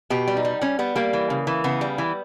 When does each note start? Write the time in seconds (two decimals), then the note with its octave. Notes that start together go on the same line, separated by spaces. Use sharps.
0.10 B2 G4
0.28 G3
0.37 D#4
0.45 G3
0.61 G3 C#4
0.79 G3 B3
0.96 G3 A#3
1.13 E3
1.30 C#3
1.47 E3
1.64 C#3 B3
1.81 G3
1.98 E3